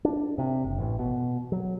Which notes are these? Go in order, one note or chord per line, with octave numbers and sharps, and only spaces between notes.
D4
C3
F#1
A1
B2
F#3